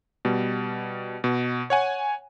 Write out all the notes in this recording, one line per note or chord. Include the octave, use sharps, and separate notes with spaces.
B2 G3
B2
C#5 F#5 G#5